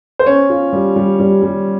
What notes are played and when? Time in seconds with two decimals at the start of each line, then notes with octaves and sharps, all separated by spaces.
0.19 C5
0.26 C#4 C#5
0.50 F4
0.73 G3
0.96 G3
1.20 G3
1.43 G3